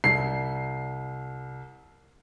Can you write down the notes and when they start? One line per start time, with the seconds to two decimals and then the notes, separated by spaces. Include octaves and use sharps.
0.04 C2 C7